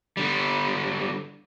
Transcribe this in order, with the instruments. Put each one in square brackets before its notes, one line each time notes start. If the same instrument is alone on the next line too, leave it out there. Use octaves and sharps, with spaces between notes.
[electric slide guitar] D3 G3